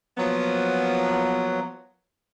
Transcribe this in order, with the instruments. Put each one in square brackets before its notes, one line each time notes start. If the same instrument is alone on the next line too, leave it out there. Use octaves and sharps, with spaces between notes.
[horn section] F3 A#3 B3 [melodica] F#3